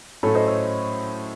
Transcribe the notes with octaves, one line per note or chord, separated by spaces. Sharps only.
A2 F#3 A3 C#4 A4 C#5
C5 D#5
A4 C#5